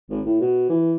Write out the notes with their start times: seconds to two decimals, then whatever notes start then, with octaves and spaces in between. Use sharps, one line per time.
0.10 G#1
0.26 A2
0.41 B2
0.69 E3